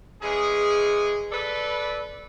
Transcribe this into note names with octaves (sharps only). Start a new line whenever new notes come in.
C#3 E3 G#3 G#4
A4 B4 D5